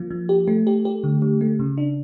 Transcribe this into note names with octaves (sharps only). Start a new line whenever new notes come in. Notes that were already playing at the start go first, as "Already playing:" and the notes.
Already playing: F3 A#3
F3
G4
A3
G4
G4
D3
D3
A3
C#3
D4